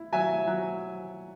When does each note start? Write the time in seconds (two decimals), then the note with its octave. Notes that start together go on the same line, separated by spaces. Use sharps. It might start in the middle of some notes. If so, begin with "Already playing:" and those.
Already playing: E4
0.12 F#3 E5 G#5
0.47 F#3